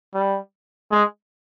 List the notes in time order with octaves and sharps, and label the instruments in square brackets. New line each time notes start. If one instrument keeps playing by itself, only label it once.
[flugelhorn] G3
G#3